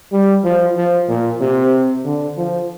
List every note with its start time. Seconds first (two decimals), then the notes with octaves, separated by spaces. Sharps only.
0.12 G3
0.44 F3
0.77 F3
1.09 A#2
1.40 C3
2.05 D3
2.37 F3